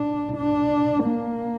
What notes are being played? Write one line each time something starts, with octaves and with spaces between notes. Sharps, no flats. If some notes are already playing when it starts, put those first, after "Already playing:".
Already playing: D4
D4
A#3